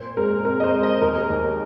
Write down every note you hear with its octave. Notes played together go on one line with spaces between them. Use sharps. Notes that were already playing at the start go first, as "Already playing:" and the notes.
Already playing: A#2 C5
G#3 A#4
C4 A#4
D#5
C5
G#3
D#5
D#2 A#4
D#2